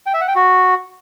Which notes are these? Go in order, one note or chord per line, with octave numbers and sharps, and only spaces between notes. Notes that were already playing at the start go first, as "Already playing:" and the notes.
G5
E5
F#5
G5
F#4